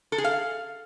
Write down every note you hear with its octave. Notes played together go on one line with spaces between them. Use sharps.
A4
G#4
F5